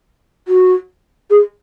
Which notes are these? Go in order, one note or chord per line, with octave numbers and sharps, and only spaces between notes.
F#4
G#4